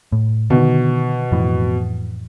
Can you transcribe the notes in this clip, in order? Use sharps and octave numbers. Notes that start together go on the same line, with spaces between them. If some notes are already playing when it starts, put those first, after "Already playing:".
A2
B2 D3 D#3
F2 A2 E3